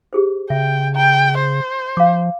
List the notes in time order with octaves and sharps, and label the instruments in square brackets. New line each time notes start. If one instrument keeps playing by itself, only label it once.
[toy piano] G4 G#4 C5
[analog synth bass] C#3 [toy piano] E5 [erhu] G5
[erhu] G5 [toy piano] A#5
[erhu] C5
[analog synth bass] F3 [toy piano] F5 D6